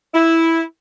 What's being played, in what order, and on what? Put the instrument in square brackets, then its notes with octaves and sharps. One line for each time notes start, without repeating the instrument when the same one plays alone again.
[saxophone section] E4